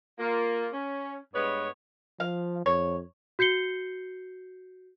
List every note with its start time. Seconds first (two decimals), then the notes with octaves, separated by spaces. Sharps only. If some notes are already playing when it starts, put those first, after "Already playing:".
0.19 A#3 F4
0.73 C#4
1.34 G2 G#3 B3 B4 C#5
2.20 F3 F5
2.66 F2 C#5
3.39 F#4 G6 C7 C#7 G7